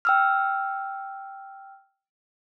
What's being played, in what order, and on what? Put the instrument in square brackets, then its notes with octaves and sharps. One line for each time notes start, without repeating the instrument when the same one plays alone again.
[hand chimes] G5 E6 F6